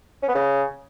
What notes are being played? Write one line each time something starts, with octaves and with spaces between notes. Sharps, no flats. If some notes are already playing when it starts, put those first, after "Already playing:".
C#4
B3
C#3